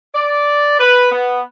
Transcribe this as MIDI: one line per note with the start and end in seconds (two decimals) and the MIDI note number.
0.15 0.76 74
0.79 1.10 71
1.11 1.41 59